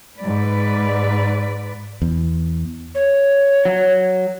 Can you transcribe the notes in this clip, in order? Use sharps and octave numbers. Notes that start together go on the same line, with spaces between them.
G#2 B4 D5
E2
C#5
F#3